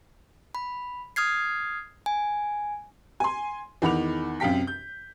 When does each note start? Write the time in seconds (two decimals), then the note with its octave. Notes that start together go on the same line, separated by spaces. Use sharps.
0.55 B5
1.16 D#6 F6 G#6 C7
2.06 G#5
3.20 G#5 C6
3.82 E2 D#3 F#5 B5 D6 F7
4.40 F#2 C3 F5 G5 B6
4.67 G6